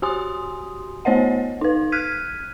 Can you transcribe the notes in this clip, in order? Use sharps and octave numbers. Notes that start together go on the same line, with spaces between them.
F#4 G4 G#5 C6 D#6
A3 B3 C5 C#5 D#5 F#5
D#4 B4
F6 F#6 G#6 B6 D#7